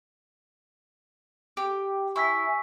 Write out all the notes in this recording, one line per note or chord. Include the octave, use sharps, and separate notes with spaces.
G4
E4 G#5 C#6 E6 B6